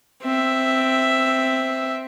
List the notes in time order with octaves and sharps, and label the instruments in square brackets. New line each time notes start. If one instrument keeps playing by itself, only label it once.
[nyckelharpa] C4 E5